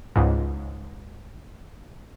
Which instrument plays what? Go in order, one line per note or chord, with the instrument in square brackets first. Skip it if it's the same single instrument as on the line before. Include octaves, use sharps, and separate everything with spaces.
[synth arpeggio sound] C#2 G#2